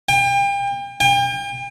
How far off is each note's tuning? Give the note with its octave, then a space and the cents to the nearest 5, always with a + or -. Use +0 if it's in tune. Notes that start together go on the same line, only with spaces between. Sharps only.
G5 +35
G5 +40